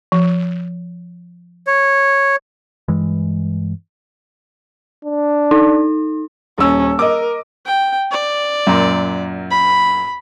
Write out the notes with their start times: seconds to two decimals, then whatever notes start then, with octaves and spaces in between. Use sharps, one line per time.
0.12 F3
1.67 C#5
2.88 G2 E3 G#3
5.05 D4
5.51 D#4
6.58 D#1 C#4 E6
6.99 A#4 D#5 D6
7.66 G5
8.12 D5
8.67 F#2 A#2
9.51 B5